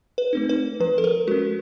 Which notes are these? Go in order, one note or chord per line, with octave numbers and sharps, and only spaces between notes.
B4
A3 C4 D#4
B4
F3 B4
A4
A#4
G#3 C#4 F#4